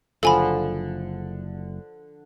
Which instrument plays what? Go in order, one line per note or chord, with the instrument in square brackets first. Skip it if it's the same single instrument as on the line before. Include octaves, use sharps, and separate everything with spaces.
[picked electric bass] F#1 [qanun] D3 F3 [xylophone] A4 G#5 B5